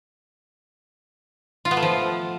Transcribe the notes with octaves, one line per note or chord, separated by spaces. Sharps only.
F4
B3
A3
F3